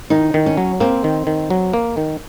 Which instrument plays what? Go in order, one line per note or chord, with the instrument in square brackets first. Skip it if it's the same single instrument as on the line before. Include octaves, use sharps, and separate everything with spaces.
[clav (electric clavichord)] D#3 [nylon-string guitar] D#4
[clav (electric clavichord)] D#3
[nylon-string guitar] C#4
[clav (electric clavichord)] F#3
[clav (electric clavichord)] A#3 [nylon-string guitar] C4
[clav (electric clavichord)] D#3
D#3
F#3
A#3
D#3